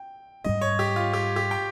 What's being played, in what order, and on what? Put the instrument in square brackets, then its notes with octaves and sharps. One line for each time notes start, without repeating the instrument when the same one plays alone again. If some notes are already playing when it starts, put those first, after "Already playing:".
Already playing: [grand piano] G5
[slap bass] G#2 G3 C#4 [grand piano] D#5
[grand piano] C#5
G4
F4
G4
G4
G5